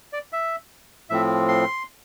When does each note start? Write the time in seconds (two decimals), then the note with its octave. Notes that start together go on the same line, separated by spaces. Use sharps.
0.13 D5
0.33 E5
1.10 A2 F3 C4 E5
1.48 C6